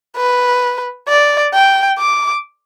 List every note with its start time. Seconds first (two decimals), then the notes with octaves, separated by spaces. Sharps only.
0.17 B4
1.09 D5
1.54 G5
1.99 D6